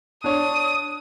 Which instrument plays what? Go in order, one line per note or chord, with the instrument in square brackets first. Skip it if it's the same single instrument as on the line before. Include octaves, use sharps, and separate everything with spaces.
[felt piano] D4 C#5 [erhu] D#6